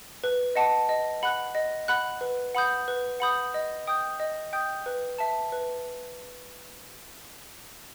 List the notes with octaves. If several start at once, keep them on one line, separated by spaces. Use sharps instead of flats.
B4
D#5 F#5 A5
D#5
F#5 B5 F#6
D#5
F#5 B5 F#6
B4
F#5 B5 D#6 G6
B4
F#5 B5 D#6 G6
D#5
G5 D#6 G6
D#5
G5 D#6 G6
B4
E5 A5
B4